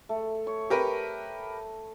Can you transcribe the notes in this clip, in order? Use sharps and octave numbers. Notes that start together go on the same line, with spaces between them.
A3
C#5
G4 A#4 B4